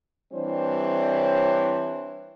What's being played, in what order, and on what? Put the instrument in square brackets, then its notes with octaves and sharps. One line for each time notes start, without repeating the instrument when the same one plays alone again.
[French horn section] E3 G3 C4 D4 C5 C#5